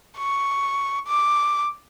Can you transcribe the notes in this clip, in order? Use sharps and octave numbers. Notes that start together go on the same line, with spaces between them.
C#6
D6